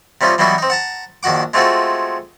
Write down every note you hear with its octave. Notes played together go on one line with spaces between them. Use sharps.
C3 G3 C#4 D#4 F4
E3 F#3 G3 B3 D#4 F#4
C4 D#4
F#5 A5 A#5
A#1 D#3 F#4 F#5 D6
G#3 A3 C4 F4 F#4 G#4